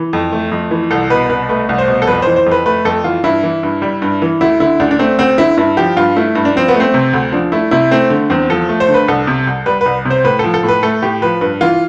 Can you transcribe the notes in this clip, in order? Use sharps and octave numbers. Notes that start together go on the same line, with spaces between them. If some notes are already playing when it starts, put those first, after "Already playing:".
Already playing: E3
F2
A3
F2
E3
C2 A4
B2 B4
C2 B4
A3 B4
C2
C5
B2
A4
F2 B4
E3 C5
C5
F2
B4
A3 B4
F2 A4
E3 F4
G2 E4
E3
G2
G3
G2
E3
D2 E4
D3 E4
D2 D4
D4
A3 C4
D2 C4
D3 E4
G2 E4
F3 G4
G2 F4
A3 E4
G2
D4
F3 C4
B3
A3
C4
C3
D2
F3 D4
A3 E4
C3 E4
A3 C4
D3
E2 C4
F3 A4
A3
C5
D3
B4
C2 A4
C3
C2
G3 B4
C2 B4
C3
C5
A2 B4
F3 A4
A4
A2 B4
A3 A4
A2 G4
F3 B4
G2 B4
E3 F4